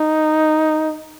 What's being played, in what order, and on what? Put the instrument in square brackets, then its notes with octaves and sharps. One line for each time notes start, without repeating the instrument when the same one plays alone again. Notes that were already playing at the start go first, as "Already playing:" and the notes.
Already playing: [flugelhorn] D#4